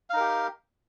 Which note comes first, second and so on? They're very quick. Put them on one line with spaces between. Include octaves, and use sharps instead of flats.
F5 D#4 A#4 G4